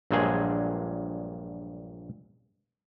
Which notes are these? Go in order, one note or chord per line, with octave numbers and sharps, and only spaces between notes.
A#1 G2 A#2 F#3 G#3 G#4